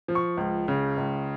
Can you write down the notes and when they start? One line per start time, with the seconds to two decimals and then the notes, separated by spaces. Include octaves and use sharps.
0.08 F3
0.15 C#6
0.37 C#2
0.68 C#3
0.97 C#2